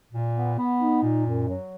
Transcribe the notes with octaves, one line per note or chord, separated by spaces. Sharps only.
A#2
B3
B3
D#4
A#2
F#2
F#3